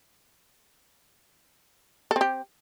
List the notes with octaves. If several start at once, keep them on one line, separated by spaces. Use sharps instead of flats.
C4 G4 A4